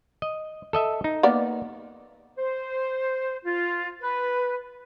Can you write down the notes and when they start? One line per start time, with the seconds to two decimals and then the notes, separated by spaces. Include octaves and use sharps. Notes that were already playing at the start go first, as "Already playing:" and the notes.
0.22 D#5
0.73 A4 D#5 E5
1.04 D#4
1.23 A#3 B3 D5
2.37 C5
3.45 F4
4.03 B4